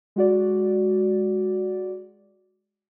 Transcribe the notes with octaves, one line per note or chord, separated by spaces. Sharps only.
G#3 F#4 D5